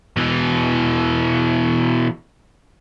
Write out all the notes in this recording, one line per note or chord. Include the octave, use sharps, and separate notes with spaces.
B2 E3